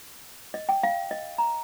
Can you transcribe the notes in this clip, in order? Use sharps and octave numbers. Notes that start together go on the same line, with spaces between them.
D#5
G5
F5
D#5
A#5